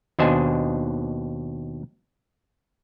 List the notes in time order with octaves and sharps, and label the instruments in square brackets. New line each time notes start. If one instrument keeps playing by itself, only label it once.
[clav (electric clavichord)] D#2 B2 D4 C5 D#5 G#5